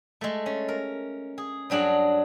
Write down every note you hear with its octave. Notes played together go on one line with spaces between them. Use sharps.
G#3 A3
C#4
A#4
G#4
G2 F#3 D4 G#4 F#5 A#5